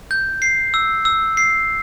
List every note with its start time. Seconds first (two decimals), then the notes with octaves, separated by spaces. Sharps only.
0.11 G6
0.42 C7
0.74 E6
1.05 E6
1.37 C7